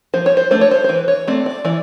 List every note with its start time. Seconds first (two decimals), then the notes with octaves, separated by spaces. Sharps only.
0.14 F3 C5
0.26 C#5
0.37 C5
0.51 A3 D4 C5
0.61 C#5
0.71 C5
0.84 C5
0.89 E3 B4
1.08 C#5
1.27 A3 C4 D5
1.46 D5
1.65 E3 D5